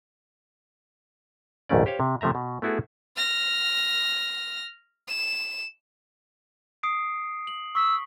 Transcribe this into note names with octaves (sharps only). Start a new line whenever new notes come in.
A#1 D#2 G#2 A3 C#4 D5
G4 C5 C#5 F5
C3
C3 F3 A3 E5 A#5
B2
A3 B3 E4 F#4 G#4 A4
F6 A#6
E7
D#6 C7 D7
F#7
C#6 E6 B6